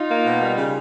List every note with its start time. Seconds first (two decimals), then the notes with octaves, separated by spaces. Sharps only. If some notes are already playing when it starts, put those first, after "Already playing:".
Already playing: D#4 F4
0.09 A#3
0.26 B2
0.41 G3
0.58 C#3